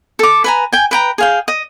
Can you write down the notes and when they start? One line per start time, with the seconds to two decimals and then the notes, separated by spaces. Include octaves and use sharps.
0.19 A4 D6
0.44 B4 G#5 A#5
0.73 G5 G#5
0.91 B4 G5 A#5
1.18 G#4 F5 G5
1.48 D#5